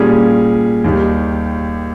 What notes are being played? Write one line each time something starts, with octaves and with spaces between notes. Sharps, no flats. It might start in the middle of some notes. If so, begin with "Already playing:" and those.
Already playing: A#2 G3 C#4 G#4
D#2 D#3 G3